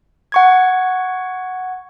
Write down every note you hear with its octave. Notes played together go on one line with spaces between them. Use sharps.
F#5 C#6 G#6